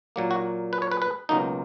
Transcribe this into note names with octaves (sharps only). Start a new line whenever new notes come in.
A#2 F#3 A#3
F#4
B4
C#5
B4
B4
C#2 B2 F#3 A#3 D#4